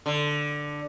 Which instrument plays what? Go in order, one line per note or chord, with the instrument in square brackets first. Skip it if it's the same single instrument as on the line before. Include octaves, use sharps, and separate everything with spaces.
[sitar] D3